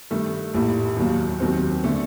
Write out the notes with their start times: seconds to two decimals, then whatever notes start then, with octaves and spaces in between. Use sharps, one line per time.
0.10 G2 D#3 A3
0.54 A#1 A2 G3 A#3
0.96 D#2 D#3 F#3 A#3
1.40 D#2 D#3 F#3 C4
1.84 D3 A3